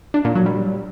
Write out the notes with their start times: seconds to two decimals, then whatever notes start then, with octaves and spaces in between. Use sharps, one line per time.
0.14 D4
0.25 A#2
0.35 F#3
0.46 G3